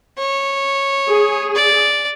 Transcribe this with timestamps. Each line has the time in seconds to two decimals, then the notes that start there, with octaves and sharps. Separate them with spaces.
0.18 C#5
1.08 G#4
1.55 D5